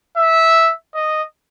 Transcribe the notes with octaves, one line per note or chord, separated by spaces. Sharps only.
E5
D#5